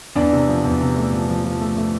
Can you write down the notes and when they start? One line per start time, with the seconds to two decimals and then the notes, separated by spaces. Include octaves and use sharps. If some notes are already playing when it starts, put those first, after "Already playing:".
0.16 E2 D4 D5
0.33 C3
0.48 F3
0.65 E2
0.81 C3
0.96 A3
1.12 F3
1.29 F3
1.44 F3
1.61 A3
1.77 A3